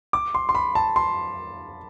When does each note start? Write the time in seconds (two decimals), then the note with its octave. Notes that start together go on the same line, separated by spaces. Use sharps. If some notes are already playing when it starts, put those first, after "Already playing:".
0.13 D6
0.35 C6
0.49 C6
0.55 B5
0.75 A5
0.96 C6